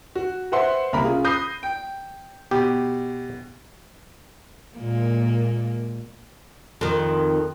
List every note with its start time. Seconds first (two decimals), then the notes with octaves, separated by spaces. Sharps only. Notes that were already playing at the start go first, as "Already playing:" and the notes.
0.15 F#4
0.52 B4 C5 E5 F#5 C6
0.93 C2 A#3 A#4 A#5 B5
1.04 C#4 F4 G#4
1.24 B5 D#6 G6 A#6 C7
1.63 G5
2.51 B2 G4
4.77 A#2 G#3 A#3
6.81 F2 D#3